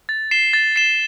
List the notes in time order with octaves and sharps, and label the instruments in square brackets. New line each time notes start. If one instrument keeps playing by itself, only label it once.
[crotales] A6
C7 E7 G7
A6
C7 E7 G7